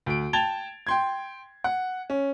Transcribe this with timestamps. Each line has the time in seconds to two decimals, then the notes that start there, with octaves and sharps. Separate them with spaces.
0.06 D2 D7
0.33 G5 A5 G#6 A6 F7 G7
0.87 G5 C6 G#6
1.64 F#5
2.10 C#4